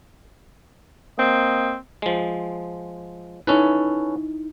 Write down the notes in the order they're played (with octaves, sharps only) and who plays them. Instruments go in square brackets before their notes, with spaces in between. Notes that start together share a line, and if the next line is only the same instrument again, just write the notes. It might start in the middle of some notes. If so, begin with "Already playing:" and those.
[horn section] A#3 C4 D#5
[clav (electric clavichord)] F3 G#3
[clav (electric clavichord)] C#4 A4 B4 [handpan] D#4 E4